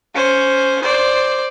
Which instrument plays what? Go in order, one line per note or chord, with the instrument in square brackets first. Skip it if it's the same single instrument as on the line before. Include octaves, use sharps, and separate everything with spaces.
[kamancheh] C#4 C5
C5 D5